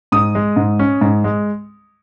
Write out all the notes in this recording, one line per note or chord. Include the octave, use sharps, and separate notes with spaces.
G#2 D#6
G#3
G#2
C#4
G#2
G#3